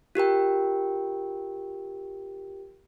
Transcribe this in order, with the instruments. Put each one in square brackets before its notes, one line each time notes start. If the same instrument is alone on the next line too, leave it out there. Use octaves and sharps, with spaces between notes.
[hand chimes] F4 G4 A#4 G5